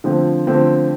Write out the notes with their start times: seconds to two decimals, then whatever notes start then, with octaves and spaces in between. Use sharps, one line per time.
0.04 D3 F3 A3 C4
0.47 D3 F3 A3 C4